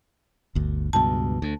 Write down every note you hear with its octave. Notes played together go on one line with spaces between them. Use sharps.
G1 D2
C#2 G2 B2 A5
D2